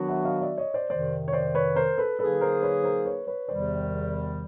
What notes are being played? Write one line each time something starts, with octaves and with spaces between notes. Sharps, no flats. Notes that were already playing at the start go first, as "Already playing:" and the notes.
Already playing: D#3 F#3 B3 D4 F#4
E5 F#5
D#5 F5
D5 E5
C#5 D#5
C5 D5
F2 C3 D#3 C5 D5
C#5
C5 D5
B4 C#5
A#4 C5
A4 B4
D3 F#3 A#3 D#4 G#4 A4 B4
A#4 C5
B4 C#5
A#4 C5
B4 C#5
B4 C#5
E2 C3 D#3 G3 C5 D5